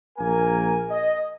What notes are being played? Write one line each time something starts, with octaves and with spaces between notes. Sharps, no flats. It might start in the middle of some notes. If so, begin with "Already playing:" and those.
A#1 A#3 A#4 G#5
D#5